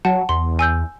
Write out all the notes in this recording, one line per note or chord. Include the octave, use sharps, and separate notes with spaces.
F#3 F#5 A5
E2 C6
G#5 E6 G6